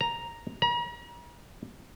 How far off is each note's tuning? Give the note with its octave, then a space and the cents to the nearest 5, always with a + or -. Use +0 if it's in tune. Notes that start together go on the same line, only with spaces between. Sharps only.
A#5 +5
A#5 +45